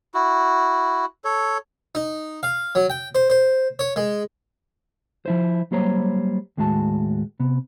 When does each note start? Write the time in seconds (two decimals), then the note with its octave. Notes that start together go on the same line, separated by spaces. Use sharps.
0.14 E4 F#4
1.24 A4 C#5
1.95 D#4
2.43 F5
2.75 F#3
2.90 G5
3.15 C5
3.30 C5
3.79 C#5
3.96 G#3
5.26 F3 E4 C5
5.72 F#3 G3 A#3 C5 C#5 A#5
6.57 D#2 A2 G#3 F#4 A5
7.40 C3 B3